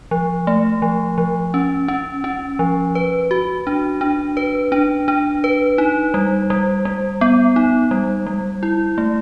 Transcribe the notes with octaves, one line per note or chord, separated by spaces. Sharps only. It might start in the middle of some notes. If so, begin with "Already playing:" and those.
F3
A3
F3
F3
C#4
C#4
C#4
F3
B4
F#4
D4
D4
B4
D4
D4
B4
D#4
G3
G3
G3
B3
D#4
G3
G3
E4
A3